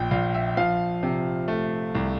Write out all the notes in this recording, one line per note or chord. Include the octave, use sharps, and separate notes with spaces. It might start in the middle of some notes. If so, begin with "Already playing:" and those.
Already playing: A#1 A#2 G5
A#1 F5
E5
F3 F5
C3
A3
C2